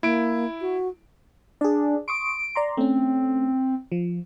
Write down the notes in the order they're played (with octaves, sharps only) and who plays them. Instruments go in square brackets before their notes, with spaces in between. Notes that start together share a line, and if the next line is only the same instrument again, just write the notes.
[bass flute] A#3 [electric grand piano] E4 D7
[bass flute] F#4
[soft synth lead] D4 [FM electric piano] G#4 D5
[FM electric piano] C6 C#6 D#6 [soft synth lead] D7
[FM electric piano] D5 A#5 C6
[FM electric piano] A3 C#4 [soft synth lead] C4
[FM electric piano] F3